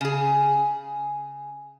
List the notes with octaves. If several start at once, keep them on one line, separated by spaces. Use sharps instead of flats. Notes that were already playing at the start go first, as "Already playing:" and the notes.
C#3 G#4